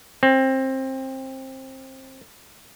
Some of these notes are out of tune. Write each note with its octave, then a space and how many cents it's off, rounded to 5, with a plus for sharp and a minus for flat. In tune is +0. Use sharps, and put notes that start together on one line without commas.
C4 +20